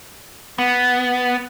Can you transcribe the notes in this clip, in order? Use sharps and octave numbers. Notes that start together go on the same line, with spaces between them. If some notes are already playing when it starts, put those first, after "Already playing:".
B3